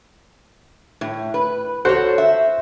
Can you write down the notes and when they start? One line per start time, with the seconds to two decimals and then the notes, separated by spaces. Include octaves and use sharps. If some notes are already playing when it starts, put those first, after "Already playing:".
1.01 A2
1.34 B4
1.85 F#4 A4 C5 C#5 F#5
2.18 E5